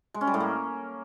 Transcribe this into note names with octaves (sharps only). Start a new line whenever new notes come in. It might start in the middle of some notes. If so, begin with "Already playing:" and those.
G#3
C#4
G3
A2
A#3